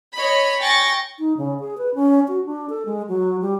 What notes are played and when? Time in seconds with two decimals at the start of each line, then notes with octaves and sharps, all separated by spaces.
0.14 C#5 D#5 B5
0.60 G5 G#5 C#6 A6 A#6
1.19 D#4
1.37 C#3
1.60 G#4
1.78 B4
1.95 C#4
2.28 F#4
2.46 D4
2.70 A4
2.86 G#3
3.08 F#3
3.42 G3